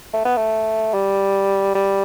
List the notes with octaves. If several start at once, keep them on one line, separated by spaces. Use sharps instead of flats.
A3
B3
A3
G3
G3